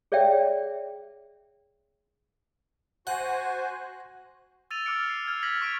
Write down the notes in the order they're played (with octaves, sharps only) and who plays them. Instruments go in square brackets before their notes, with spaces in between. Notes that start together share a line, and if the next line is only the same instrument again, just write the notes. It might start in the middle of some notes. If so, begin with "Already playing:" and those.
[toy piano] G#4 C#5 D5 E5 G5
[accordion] F#4 C5 G#5 [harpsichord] F#5
[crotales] E6 A6 D#7 F7
D6 E6 F6 A6 C#7 D7
C7
F6 G#6
F6 G#6 A#6 B6 F#7
C#6 B6 D7 F7